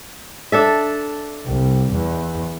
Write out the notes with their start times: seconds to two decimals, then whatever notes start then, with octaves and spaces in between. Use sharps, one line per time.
0.52 D4 A4 E5
1.47 C2
1.93 E2